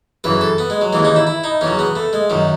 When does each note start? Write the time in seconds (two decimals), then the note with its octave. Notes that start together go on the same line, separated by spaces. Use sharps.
0.24 F#2 C#3 E3 B4
0.41 A4
0.58 B3
0.70 G#3
0.81 F#3
0.93 D#2 C#3 E3 G#3
1.05 D#4
1.16 E4
1.27 E4
1.44 D#4
1.61 E2 C#3 F#3 C#4
1.79 B3
1.96 A3
2.13 G#3
2.30 F#2 D#3 F#3